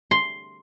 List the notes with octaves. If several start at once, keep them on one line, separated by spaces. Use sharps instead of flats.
C6